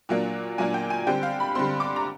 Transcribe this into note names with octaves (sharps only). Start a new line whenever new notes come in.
A#2 F#3 A#3 D4
A#2 F#3 A#3 D4 G#5
G5
G#5
D3 G3 C4 G5
F5
B5
D3 G3 C4 C6
D6
A#5